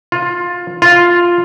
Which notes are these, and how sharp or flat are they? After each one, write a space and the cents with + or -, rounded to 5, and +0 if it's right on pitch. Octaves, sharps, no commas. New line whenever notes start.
F4 +15
F4 +0